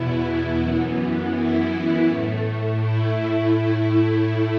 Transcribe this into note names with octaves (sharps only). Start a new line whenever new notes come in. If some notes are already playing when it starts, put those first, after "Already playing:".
Already playing: E2 B2 B3 E4
F#2 E3 B3
E4
A2 A3
E4
A2 A3